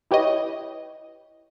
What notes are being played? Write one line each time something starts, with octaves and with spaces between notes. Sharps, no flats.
E4 G4 B4 C#5 D#5